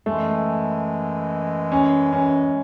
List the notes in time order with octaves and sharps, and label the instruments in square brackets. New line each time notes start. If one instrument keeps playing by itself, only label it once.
[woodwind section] F#2 E3 G#3 [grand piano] A3
[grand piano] C#4
C#4